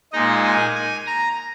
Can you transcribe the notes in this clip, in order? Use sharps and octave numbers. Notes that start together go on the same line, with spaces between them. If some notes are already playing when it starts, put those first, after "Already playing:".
A#2 G#3 D#4 D#5
G#5
G#5
A#5